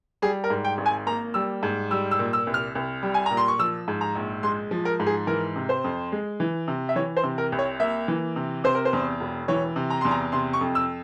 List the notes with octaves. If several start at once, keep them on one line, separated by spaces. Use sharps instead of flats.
G3 G#4
A#4
G#2
G5
G#1
G#5
A#3 A#5
G3 E6
G#2
G3 E6
E6
A#2
E6
C2
F6
C2
G3
G#5
A#2 A#5
C6
C#6
F3 E6
G#2
A#5
A#1
G#3 C6
F3
A#4
G#2
G#4
E3 A#4
C3
C5
F2
G#3
E3
C3
E5
E3 C#5
C5
C3
A#4
C2
C#5
A#3 E5
E3
C3
C3 C5
A#4
C5
E2
E1
E3 C#5
C3
A#5
E2 C6
A#5
C3 C6
C#6
F2
E6